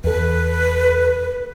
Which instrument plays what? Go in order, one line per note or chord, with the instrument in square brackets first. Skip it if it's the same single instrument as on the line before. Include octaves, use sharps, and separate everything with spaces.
[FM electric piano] E2 A4 [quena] B4